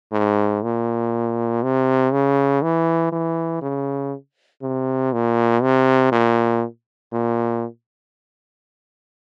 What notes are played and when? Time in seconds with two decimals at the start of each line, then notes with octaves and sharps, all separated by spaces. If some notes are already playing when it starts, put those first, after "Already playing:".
0.12 G#2
0.63 A#2
1.63 C3
2.13 C#3
2.62 E3
3.12 E3
3.62 C#3
4.62 C3
5.13 A#2
5.62 C3
6.12 A#2
7.13 A#2